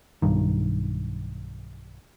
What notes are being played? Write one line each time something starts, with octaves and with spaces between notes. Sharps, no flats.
B1 G2 D#3